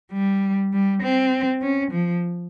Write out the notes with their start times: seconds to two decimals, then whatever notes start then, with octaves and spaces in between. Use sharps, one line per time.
0.13 G3
0.73 G3
1.03 C4
1.62 C#4
1.92 F3